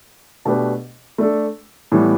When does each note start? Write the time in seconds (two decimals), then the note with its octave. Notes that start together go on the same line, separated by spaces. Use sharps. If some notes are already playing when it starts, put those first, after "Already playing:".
0.45 B2 A3 D4 G4 B4
1.18 A3 D4 A4
1.92 A2 E3 G3 B3